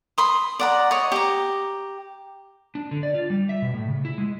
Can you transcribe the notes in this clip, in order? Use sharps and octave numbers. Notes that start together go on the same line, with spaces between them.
B5 C6 D#6
D5 F#5 A#5
C#5 D#5
G4 A#5
D4
D3
D5
F4
G3
E5
B2
A2
C#3
E4
G#3